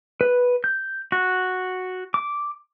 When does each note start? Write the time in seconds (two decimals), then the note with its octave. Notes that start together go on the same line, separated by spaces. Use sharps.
0.21 B4
0.64 G6
1.12 F#4
2.14 D6